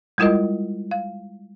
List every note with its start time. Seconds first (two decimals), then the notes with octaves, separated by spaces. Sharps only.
0.18 G3 G#3 E4 F4 A#4 D#5
0.91 F5